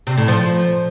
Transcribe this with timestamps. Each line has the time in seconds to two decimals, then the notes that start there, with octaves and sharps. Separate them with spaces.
0.07 C3
0.17 A2
0.28 F3